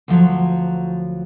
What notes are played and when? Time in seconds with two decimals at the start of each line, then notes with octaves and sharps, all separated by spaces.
0.08 D2 F3 F#3